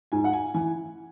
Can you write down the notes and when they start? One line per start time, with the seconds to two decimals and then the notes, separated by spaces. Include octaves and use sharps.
0.12 G#2 G#5
0.24 F#5
0.33 G#5
0.54 E3 G#5